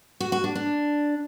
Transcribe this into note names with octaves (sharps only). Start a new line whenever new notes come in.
F#4
F#4
D4
D4